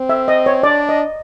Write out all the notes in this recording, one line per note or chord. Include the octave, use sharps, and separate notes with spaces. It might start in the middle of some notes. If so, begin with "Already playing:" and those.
Already playing: C4
E5
D#5
C#5
D4 D5
D#5